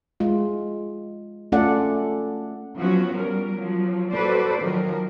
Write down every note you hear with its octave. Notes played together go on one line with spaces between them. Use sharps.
G#3 F4
A3 C#4 F4 A4 D5 F#5
F3 F#3 B3 C#4 F#4
G3 A#4
F3 F#3
F#4 A4 B4 C5 D5
D#3 F3 F#3 A#4